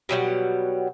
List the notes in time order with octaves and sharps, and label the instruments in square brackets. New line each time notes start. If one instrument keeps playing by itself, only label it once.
[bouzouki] B2 F#3 G3 F#5